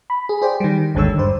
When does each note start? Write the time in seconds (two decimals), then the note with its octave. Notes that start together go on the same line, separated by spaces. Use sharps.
0.10 B5
0.29 G#4
0.42 G#4 C5 D5 G5
0.60 D#3 G3
0.95 G#1 D#2 D3 G#3 C#5 E6
1.18 G2 C5